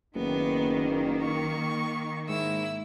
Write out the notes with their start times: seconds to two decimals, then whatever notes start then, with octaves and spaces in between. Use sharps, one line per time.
0.15 F#1 D#3 A#3 B3
1.22 C#6
2.28 G#2 E4 E6